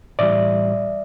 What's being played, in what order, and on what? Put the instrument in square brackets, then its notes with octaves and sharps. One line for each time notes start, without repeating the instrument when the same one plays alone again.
[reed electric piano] A2 E3 G3 D5 E5